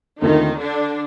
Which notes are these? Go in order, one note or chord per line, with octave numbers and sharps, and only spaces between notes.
D#2 D3 D#3 A3 C4 D#4 F4
D3 D4